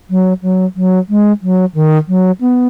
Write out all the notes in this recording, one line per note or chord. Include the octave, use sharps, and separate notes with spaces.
F#3
F#3
F#3
G#3
F#3
D#3
F#3
B3